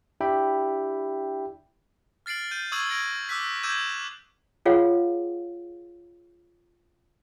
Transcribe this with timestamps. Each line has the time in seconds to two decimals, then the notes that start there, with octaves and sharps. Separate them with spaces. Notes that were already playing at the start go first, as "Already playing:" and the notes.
0.21 D4 E4 G4 E5 G5 B5
2.26 F6 A6 C7 D7 F#7
2.51 G6 D#7
2.72 C#6 D#6 E6 G#6 D#7 F#7
2.89 G#6 A#6 D7
3.29 D6 E6 F#6 B6
3.63 D6 E6 G6 G#6 D#7 E7
4.66 F4 G#4 C#5 F5 F#5